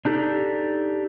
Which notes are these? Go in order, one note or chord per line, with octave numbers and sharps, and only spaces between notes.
D4 D#4 G4 A4